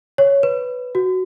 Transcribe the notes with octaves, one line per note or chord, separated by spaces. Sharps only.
C#5
B4
F#4